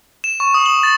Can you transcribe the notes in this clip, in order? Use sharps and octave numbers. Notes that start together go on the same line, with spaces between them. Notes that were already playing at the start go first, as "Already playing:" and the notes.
E7
C#6
D#6
F#7
A6